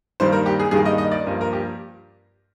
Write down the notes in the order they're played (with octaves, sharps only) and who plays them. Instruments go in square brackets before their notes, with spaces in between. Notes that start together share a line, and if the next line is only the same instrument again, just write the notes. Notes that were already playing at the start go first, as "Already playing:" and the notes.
[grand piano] G2 D#3 G3 A#3 C5
A#4
G4
G#4
G2 D#3 G3 A#3 G#4
D#5
D#5
D5
G2 F3 A#3
A#4
G4